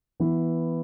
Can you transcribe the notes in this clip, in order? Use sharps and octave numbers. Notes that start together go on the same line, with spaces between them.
E3 B3 E4